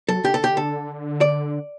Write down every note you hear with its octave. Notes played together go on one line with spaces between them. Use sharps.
F#3 A4
D3 G4
A4
G4
A4
D5